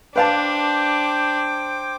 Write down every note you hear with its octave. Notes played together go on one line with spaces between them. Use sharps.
D4 B4 C5 F5 G5 A5 D6